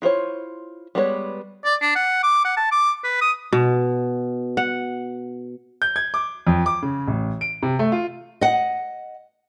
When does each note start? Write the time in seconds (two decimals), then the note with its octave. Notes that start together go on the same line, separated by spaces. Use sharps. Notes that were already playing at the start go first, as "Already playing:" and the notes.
0.02 E4 F4 C5 C#5
0.95 G3 G#3 B3 B4 C#5
1.65 D5
1.81 D4
1.96 F#5
2.23 D6
2.45 F#5
2.57 A5
2.72 D6
3.04 B4
3.21 D#6
3.53 B2
4.57 F#5
5.82 G6
5.96 G#6
6.14 D6
6.47 F2
6.66 D6
6.82 C#3
7.07 A1
7.41 D7
7.62 C3
7.79 A3
7.92 F4
8.41 D#5 F#5